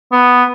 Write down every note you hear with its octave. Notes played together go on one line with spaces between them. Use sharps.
B3